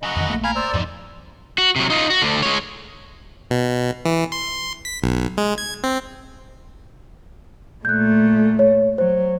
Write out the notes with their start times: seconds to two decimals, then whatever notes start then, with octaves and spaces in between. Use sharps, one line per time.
0.03 C#3 F#3 D#5 F#5 B5
0.16 F2 D#3
0.30 A#1 A3 A#3
0.44 A#4 F5 G#5 B5
0.56 C5 D5 E6
0.74 E2 G2 A#2 F3 D#4
1.58 F#4
1.76 C3 F#3
1.90 D#4 F4
2.10 F#4
2.22 D2 D3
2.43 G#3 C#5
3.51 B2
4.05 E3
4.32 C6
4.85 B6
5.02 B1
5.37 G#3
5.58 G#6
5.84 C4
7.85 A#2 A3 F#6 G6
8.59 C#5
8.98 F#3 C5